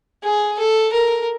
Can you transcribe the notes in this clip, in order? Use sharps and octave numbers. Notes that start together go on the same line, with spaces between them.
G#4
A4
A#4